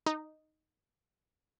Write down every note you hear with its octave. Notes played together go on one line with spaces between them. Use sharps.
D#4